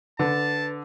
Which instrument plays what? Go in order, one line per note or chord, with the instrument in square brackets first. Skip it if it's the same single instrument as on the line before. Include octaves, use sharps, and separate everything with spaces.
[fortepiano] D3 [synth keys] B4 [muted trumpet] A5